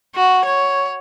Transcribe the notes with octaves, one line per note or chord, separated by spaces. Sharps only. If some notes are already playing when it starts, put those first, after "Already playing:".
F#4
C#5